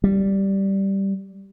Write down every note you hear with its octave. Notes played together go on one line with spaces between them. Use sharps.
G3